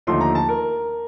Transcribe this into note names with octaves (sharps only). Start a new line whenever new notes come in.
D#2 D3 F3 A3 D#4 C6
A#5
A5
A#4